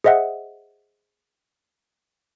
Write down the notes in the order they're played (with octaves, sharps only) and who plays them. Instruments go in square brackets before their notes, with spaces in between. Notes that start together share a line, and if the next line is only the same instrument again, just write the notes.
[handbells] G#4 C5 D#5 E5 F#5